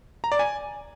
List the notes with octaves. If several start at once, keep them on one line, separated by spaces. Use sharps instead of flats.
A#5
D5
G#5